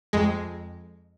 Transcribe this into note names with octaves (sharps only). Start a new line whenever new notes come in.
F2 G#3